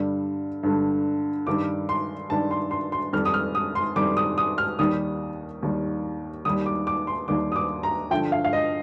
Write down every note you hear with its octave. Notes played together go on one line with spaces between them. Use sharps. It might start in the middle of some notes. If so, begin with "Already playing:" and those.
Already playing: G2 D3 G3
G2 D3 G3
G2 D#3 G3 D6
C6
G2 D#3 G3 A5
C6
C6
C6
F2 D#3 G3 F6
D#6
F6
D#6
C6
F2 D#3 G3 D6
D#6
D#6
F6
D#2 D#3 G3 D#6
D#2 D#3 G3
D#2 D#3 G3 D#6
D6
D6
C6
D#2 D#3 G3 D6
D#6
D6
A#5
G2 D3 F3 G5
F5
F5
D#5